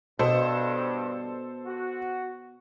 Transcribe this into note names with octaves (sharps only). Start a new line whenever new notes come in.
G2 B2 A4 C5
F#4